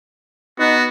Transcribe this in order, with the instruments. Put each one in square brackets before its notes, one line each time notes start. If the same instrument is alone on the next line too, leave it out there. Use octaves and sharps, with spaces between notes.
[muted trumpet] B3 [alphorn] D#4 [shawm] F#4